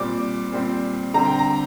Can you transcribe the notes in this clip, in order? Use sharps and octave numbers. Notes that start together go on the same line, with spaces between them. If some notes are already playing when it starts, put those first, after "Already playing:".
Already playing: A#2 G3 C4 D6
A#2 G3 C4
D3 G3 C4 A#5
G5
A#5